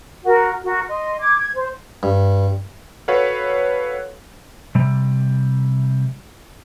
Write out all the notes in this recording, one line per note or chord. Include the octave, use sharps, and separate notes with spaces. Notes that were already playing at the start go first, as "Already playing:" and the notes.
F#4 A#4
F#4 A#4
D#5 C6
D6 G#6
G#6
C5
G2
F#4 A4 B4 C#5 F5 F#5
C3 G3